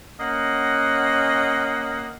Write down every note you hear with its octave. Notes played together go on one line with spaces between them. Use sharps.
A#3 C#4 D#5 F#5